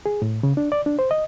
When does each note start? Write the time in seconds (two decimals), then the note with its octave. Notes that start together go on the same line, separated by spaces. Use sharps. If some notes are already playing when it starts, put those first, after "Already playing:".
0.06 G#4
0.22 A2
0.43 C#3
0.57 D4
0.72 D5
0.86 D4
0.99 C5
1.11 D#5